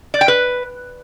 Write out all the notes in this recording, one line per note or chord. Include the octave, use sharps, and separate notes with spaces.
D5
G5
B4